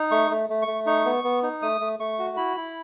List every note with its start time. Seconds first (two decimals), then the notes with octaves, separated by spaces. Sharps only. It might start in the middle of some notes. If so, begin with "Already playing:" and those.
Already playing: D#4
0.11 A3 C#6
0.31 A3
0.50 A3
0.62 C#6
0.68 A3
0.86 D#4 C#6
1.05 B3
1.24 B3
1.43 D#4
1.62 A3 D#6
1.81 A3
1.99 A3 C#6
2.19 F#4
2.37 E4 B5
2.57 E4